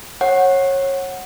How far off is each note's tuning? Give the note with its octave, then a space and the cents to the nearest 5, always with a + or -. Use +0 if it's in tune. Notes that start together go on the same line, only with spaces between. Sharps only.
C#5 -25 F#5 +0